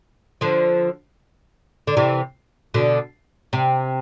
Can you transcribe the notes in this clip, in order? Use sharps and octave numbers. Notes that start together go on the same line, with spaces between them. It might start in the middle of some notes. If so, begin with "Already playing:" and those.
D3 F3
D3
C3 E3
B2 D3
C3